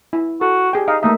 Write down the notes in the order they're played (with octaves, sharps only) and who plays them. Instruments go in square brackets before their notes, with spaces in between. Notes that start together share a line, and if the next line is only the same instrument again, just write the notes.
[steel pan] E4
[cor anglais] F#4 [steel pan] A4
[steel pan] G4 G#4 G5
[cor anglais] D#4 [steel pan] D#5 F5
[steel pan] A3 A#3 E5 [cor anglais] D#4